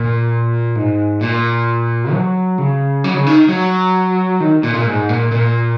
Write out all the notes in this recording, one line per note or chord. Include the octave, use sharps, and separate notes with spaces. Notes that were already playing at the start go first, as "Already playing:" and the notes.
Already playing: A#2
G#2
A#2
F#3
C#3
F#3
C#3
D#3
F#3
D#3
A#2
A#2
G#2
A#2
A#2